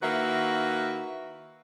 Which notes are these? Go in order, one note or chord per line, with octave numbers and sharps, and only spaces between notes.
D#3 A#3 E4 F#4 B4 E5